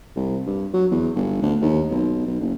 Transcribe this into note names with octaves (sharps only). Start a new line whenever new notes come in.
C2
G2
F#3
E2
G1
D2
D#2
B1
B1
F#1